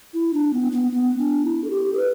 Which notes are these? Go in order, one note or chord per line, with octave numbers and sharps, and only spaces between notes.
E4
D4
B3
B3
B3
D4
E4
A4
G4
A4
B4